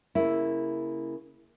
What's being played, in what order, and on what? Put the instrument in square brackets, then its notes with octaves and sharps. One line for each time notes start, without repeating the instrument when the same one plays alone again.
[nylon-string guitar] C#3 A#3 E4